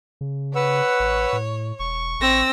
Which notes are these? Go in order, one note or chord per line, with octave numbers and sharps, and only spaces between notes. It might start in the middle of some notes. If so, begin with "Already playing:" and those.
C#3
B4 C#5 F#5 E6
A1
A2
E1 C#6
A1 C4 E6 A#6